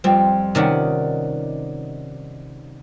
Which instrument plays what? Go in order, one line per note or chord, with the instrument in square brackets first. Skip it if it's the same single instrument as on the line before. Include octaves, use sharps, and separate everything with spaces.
[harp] F2 G3 [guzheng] C4
[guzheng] C3 D#3 C#4 [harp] D#4 D5 F#5